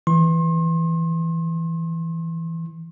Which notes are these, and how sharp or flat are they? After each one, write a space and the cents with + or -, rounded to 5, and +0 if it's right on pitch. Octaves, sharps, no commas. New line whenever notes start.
E3 +0 C6 +35